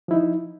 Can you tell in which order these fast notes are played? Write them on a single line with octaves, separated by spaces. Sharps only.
F3 E4 D#4